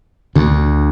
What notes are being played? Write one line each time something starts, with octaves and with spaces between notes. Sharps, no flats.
D2 D3